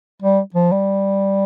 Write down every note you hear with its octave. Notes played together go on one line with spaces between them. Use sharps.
G3
F3
G3